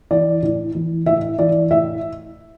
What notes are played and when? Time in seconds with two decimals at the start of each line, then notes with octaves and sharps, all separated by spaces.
0.11 E3 D5
0.43 A2
0.75 E3
1.06 A2 E5
1.39 E3 D5
1.71 A2 E5